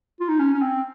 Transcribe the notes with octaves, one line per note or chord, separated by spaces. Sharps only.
F4
D#4
C#4
C#4
C4